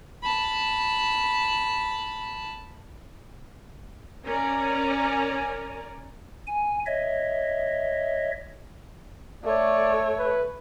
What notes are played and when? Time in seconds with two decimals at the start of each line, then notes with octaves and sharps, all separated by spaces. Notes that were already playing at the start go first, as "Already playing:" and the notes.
0.23 A5 B5
4.25 C#4 A#4 D5 G#5 A#5
6.47 G#5
6.86 C#5 D#5 E5
9.44 A3 C#5 D5
10.18 B4